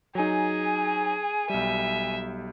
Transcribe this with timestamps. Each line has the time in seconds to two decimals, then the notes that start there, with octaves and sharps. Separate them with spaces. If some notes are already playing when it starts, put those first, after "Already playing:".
0.15 F#3 D#4 G#4 G#5
1.50 B1 G3 E5